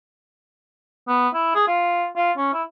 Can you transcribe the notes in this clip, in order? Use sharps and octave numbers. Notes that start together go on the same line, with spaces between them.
B3
E4
G#4
F4
F4
C#4
E4